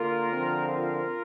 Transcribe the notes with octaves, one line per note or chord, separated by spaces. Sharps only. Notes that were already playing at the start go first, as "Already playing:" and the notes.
Already playing: D3 A#3 F4 A#4
D3 F3 C4
F4 A#4